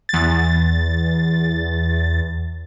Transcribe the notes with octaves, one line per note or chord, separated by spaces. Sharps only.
E2 A6